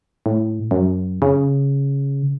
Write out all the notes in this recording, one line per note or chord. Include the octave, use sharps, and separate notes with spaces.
A2
F#2
C#3